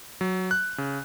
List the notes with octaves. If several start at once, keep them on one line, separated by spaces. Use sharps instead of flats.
F#3
F#6
C#3